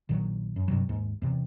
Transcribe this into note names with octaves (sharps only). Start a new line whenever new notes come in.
A#1 A#2 D#3 F#3
F#2
G2 C3 F#3
D#2 G#2
E2 C3